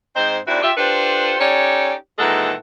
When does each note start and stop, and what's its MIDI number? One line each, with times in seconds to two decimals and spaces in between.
0.16 0.37 44
0.16 0.37 60
0.16 0.37 63
0.16 0.37 72
0.48 0.63 39
0.48 0.63 60
0.48 0.63 62
0.48 0.63 64
0.48 0.63 66
0.48 0.63 74
0.63 0.72 65
0.63 0.72 67
0.63 0.72 76
0.77 1.36 62
0.77 1.36 65
0.77 1.36 67
0.77 1.36 69
0.77 1.36 71
0.77 1.36 72
1.40 1.93 61
1.40 1.93 63
1.40 1.93 67
1.40 1.93 69
1.40 1.93 73
1.40 1.93 74
2.19 2.54 46
2.19 2.54 51
2.19 2.54 52
2.19 2.54 56
2.19 2.54 69
2.19 2.54 78